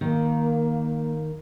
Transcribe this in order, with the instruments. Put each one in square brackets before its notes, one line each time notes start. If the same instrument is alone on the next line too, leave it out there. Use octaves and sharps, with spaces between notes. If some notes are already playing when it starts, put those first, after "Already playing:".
[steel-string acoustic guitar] D#3 [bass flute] A#3